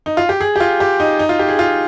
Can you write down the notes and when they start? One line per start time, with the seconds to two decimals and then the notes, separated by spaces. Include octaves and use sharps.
0.06 D#4
0.17 F4
0.29 G4
0.41 G#4
0.56 G4
0.60 F4
0.80 G4
1.00 D#4
1.19 D#4
1.29 F4
1.39 G4
1.49 G#4
1.59 F4